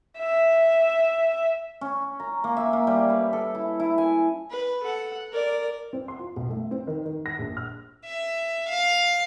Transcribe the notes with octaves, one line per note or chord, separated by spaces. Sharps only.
E5
C#4
A#5
A#3
E5
A#3
G3
B4
A4
E4
E4
G#5
B4
A4 F#5
A#4 D5
C4
C6
F4
B1
A3
C4
D#3
D#3
A#6
A#1
F6
E5
F5